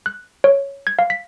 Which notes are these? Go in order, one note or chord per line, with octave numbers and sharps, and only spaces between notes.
F#6
C#5
G#6
F5
B6